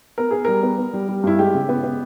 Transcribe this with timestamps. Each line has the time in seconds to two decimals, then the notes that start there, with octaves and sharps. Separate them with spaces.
0.18 B3 A#4
0.31 B3 G#4
0.45 G3 A#4
0.63 B3
0.78 B3
0.93 G3
1.08 G3
1.23 G2 E4
1.39 G#3 G4
1.54 C#3
1.69 B3
1.83 B3